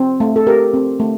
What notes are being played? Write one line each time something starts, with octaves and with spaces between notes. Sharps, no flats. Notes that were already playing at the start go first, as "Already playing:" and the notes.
Already playing: C4
A3
A4
G4 A#4
C4
A3